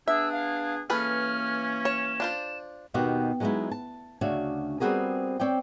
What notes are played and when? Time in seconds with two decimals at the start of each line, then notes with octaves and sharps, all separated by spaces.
0.08 B3 D4 G#4 E5 E6
0.32 F5
0.90 E3 A#3 C#4 G#4 A4 B4 F6
1.85 C#5 E7
2.20 D4 F4 C5
2.94 D#2 B2 D#3 F#4 G4
3.40 F#3 G#3 B3 C#4 D#4 E4
3.71 A5
4.21 D2 C#3 D4 F#4 C#5 E5
4.80 G3 B3 C4 F#4 G#4 A#4
5.40 C4 C#5 D5 G5